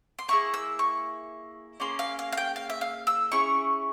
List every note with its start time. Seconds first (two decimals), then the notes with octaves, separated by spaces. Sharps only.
0.19 C6
0.28 A#3 E4 G#4 C#6
0.54 E6
0.79 C#6
1.80 A#3 C#4 G#4 C6
1.99 F5
2.19 F5
2.32 F5
2.37 G5
2.56 F5
2.70 E5
2.81 F5
3.07 E6
3.32 C#4 E4 G#4 C#6